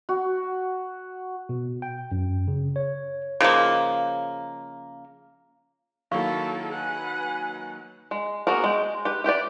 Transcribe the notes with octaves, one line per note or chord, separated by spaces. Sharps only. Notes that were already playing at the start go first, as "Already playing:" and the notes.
F#4
B2
G5
F#2
C#3
C#5
C#3 F3 G#3 A#3
D#3 F#3 A#3 E4 A4 F5 C#6
B4 F#5 G#5
G#3
A#3 B3 F#4 G#4 A#4
G#3 G5
G4 B4
E4 G4 B4 D5